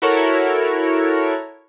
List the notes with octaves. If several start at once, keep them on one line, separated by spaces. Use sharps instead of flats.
E4 F#4 A4 A#4 C#5